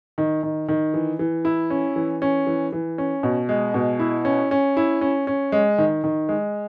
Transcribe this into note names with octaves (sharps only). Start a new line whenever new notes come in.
D#3
D#3
D#3
E3
E3
E4
C#4
E3
C#4
E3
E3
C#4
B2
G#3
B2
E4
C#4
C#4
E4
C#4
C#4
G#3
D#3
D#3
G#3